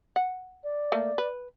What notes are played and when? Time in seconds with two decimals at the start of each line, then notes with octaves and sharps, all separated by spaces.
0.16 F#5
0.64 D5
0.92 A3 A#3
1.18 B4